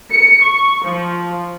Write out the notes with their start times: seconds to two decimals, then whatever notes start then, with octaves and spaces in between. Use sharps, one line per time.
0.12 C#7
0.43 C#6
0.85 F3